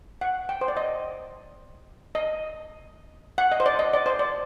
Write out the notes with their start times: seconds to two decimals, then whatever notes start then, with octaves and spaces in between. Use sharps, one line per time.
0.21 F#5
0.49 G5
0.61 C5
0.68 D5
0.77 D#5
2.15 D#5
3.38 F#5
3.52 D#5
3.60 C5
3.66 D5
3.79 D#5
3.93 D5
4.06 C5
4.19 D5